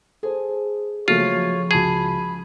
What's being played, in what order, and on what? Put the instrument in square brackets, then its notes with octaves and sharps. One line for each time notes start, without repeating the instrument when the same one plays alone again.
[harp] G#4 [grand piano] A4 C5
[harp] C#3 F3 [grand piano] F#3 A3 A#3 [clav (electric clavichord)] F4 [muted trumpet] C#5
[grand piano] C#2 F#4 A5 [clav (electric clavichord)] G#4 [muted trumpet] B5